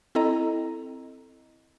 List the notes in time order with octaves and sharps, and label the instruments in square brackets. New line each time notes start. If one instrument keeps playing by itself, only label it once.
[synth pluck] C4 E4 A4 D#5 A#5